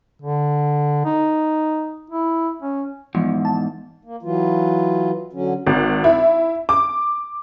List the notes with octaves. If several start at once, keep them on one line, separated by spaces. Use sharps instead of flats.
D3
D#4
E4
C#4
E2 G#2 F3
A5
A#3
E3 F#3 F4
D3 F#3 C#4
G#1
E4
D6